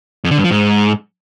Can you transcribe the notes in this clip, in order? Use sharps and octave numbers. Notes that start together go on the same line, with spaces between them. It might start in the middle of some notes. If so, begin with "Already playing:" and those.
F2
D3
G2
F3
G#2